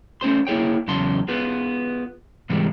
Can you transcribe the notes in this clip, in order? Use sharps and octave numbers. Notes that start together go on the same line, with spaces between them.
A3 C#4 C5 C6
A#3 E4 G#4 C#5 G5
E2 C#3 F#3 A5 C6
B3 F4 G#4 B4
G#2 C3 E3 G3 G#3